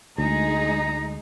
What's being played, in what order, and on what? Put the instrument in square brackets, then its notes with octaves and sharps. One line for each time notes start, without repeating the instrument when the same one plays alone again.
[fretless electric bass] D2 [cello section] G#3 D#4 G#4 [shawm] A#5